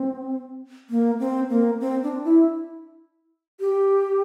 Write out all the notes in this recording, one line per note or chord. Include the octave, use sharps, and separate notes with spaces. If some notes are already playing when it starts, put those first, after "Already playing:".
Already playing: C4
A#3
C4
A#3
C4
D4
E4
G4